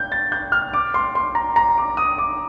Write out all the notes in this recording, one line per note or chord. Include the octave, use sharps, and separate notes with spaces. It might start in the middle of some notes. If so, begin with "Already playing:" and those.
Already playing: G6
A6
G6
F6
D6
C6
C6
A#5
A#5
D6
D#6
D6